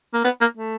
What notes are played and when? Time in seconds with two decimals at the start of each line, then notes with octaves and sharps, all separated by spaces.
0.14 A#3
0.24 B3
0.41 A#3
0.57 A3